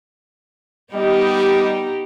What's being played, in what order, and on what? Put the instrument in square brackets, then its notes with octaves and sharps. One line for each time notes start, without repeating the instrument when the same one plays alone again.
[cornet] G3 [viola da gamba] B3 D#4 G4 [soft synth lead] D#5